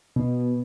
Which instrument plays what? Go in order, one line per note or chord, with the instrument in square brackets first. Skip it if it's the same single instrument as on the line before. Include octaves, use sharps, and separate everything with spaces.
[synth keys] B2